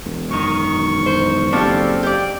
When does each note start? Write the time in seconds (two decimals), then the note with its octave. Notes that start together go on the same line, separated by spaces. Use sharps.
0.04 E1
0.31 F#2 D#3 C#6
1.06 C5
1.53 F#1 G3 C4 D4 F4 A4
2.03 G4 D5